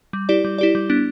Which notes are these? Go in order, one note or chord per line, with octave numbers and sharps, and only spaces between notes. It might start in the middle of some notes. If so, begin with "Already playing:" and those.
G3
E4 G4 D5
G3
E4 G4 D5
G3
B3 D4